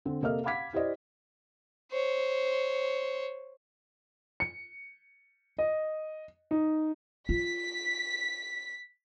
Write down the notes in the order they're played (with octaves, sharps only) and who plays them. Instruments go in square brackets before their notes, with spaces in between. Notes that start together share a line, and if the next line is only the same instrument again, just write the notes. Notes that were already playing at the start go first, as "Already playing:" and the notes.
[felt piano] D3 C4
C3 A#3 A4 D#5 F5 F6
F5 F#5 B5 D6 G#6 B6
E4 G4 C5 D5 D#5
[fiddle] C5 C#5
[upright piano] C#7
D#5
D#4
[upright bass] F4 [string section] B6